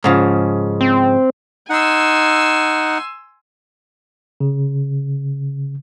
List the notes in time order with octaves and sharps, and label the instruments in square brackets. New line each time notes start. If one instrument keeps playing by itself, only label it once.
[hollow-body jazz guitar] G#2 C#3 F3
[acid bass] C4
[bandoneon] D#4 F#5 [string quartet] G#5 C6 E6
[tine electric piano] C#3